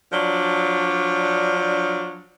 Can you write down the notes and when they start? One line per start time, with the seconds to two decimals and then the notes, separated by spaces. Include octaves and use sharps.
0.11 F3 F#3 D4